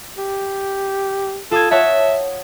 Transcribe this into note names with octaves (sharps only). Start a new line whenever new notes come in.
G4
F4 A4 D#6 G#6
C#5 E5 F#5 A5